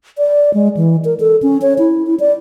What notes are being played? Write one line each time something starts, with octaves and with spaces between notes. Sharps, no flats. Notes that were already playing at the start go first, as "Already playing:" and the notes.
D5
G#3
E3
A#4
A4
C#4
C#5
E4
E4
D5